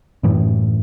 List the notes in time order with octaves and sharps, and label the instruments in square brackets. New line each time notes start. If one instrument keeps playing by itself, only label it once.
[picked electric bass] F#2 A2 E3